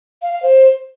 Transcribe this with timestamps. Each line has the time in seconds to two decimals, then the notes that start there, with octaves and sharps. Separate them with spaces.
0.22 F5
0.32 F5
0.43 C5